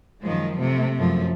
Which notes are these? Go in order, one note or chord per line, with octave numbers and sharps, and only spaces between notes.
F#2 D#3 F3 G#3
C3 A3
F#2 F3 A3